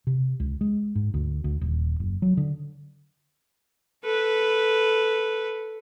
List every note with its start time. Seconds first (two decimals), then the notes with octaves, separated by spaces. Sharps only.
0.07 C3
0.40 C#2
0.61 G#3
0.95 G#2
1.14 D2
1.44 D2
1.61 D#1
2.00 F#1
2.22 F#3
2.37 D3
4.04 A4 B4